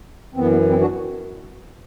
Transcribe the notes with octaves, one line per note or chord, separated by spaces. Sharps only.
F#2 E3 B3 C4
B3
C4 E4
D4 F#4